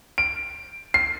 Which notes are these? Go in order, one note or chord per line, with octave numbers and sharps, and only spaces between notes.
D7
C7